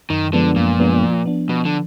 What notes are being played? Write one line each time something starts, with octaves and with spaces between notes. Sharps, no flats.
F#2 D#3
D3 F3 G#3 B3 D4
F#2 A#2
F3 G#3 B3 D4
F3
B3 D4
B2 F3
D3